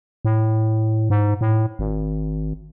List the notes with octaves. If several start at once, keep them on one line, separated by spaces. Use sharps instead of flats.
A2
G#2
A2
G#1